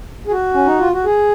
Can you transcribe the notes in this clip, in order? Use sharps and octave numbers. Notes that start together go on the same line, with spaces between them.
G#4
F#4
C#4
D#4
F4
F#4
G#4